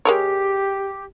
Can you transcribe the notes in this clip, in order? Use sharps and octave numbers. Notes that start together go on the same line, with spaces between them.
G#3 G4 A#4 C#5